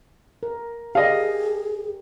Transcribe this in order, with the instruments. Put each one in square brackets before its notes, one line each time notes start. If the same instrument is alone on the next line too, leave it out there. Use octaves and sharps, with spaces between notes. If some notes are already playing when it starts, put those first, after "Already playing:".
[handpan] A#4
[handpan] G4 A#4 [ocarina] G#4 [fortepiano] D#5 F5